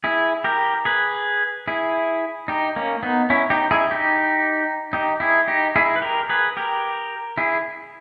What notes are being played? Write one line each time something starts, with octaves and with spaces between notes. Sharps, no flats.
E4 G#4
G4 A#4
G#4 B4
E4 G#4
D#4 G4
A#3 C#4
B3 D#4
C#4 E4
D#4 G4
E4 G#4
D#4 G4
D#4 G4
E4 G#4
D#4 G4
E4 G#4
B4
G4 A#4
G#4 B4
G4 A#4
E4 G#4